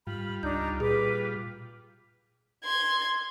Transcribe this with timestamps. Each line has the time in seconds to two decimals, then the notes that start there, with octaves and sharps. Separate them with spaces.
0.07 G#2 G3 F4 B5
0.43 C#2 D4 D#4 G6
0.80 A#2 G#4 B4 D6
2.65 C6 G#6